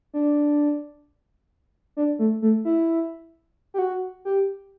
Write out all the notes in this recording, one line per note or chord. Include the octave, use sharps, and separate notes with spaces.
D4
D4
A3
A3
E4
G4
F#4
G4